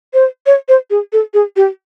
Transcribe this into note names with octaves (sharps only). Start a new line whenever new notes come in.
C5
C#5
C5
G#4
A4
G#4
G4